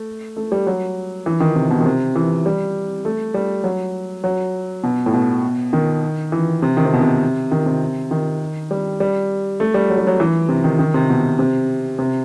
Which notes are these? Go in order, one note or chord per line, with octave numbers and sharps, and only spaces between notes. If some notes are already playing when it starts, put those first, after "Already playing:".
Already playing: A3
A3
G3
F#3
E3
D#3
C3
B2
D#3
C3
E3
G3
A3
G3
F#3
F#3
B2
A2
B2
D#3
E3
C3
D#3
C3
B2
C3
D#3
C3
D#3
G3
G3
A3
G3
F#3
G3
F#3
E3
C3
D#3
D#3
C3
B2
C3
C3